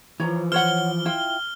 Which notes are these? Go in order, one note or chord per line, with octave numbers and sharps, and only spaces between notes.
E3 F3 C#5 A#5
C5 C#5 F#5 F6 G7
E4 F4 G5